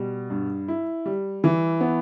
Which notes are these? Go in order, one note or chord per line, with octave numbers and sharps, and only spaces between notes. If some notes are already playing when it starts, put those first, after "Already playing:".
Already playing: B2 G3
G2
E4
G3
E3
B3